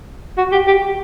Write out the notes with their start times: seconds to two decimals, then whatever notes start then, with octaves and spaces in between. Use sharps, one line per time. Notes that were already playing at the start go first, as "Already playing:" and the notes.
0.38 F#4
0.52 G4
0.67 G4